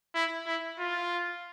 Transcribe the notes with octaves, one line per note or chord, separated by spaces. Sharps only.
E4
E4
F4